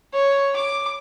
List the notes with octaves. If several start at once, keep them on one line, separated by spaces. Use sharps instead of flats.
C#5
D6